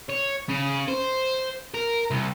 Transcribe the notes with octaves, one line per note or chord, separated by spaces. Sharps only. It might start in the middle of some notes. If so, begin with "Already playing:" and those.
C#5
C#3
C5
A#4
C2